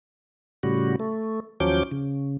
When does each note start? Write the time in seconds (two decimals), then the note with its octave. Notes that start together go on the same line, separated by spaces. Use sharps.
0.63 A2 C#3 G3 F#4
1.00 A3
1.60 D#2 F3 F#3 C#4 D6 G6
1.92 C#3